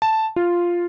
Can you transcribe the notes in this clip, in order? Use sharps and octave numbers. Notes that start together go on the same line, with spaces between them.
A5
F4